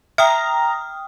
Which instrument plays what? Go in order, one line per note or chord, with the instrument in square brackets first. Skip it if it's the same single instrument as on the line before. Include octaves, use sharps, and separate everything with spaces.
[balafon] E5 [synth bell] G5 D#6 F6 [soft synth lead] A#5